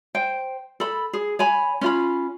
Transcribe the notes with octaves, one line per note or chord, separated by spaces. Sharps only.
C5 G5
A4 B5
G#4
C#5 G#5 B5
C#4 F4 B5